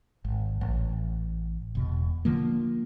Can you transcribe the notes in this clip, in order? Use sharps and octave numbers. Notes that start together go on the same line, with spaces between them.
G#1
A1
E1 B2
D3 F3 A#3